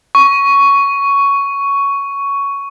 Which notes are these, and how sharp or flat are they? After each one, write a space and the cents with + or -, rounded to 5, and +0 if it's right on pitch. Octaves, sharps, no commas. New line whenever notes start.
C#6 +10